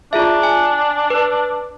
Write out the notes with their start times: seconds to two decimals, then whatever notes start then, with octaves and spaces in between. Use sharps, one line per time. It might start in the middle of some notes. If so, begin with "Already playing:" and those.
0.13 D4 F4 G#4 E5
0.43 G#5
1.10 B4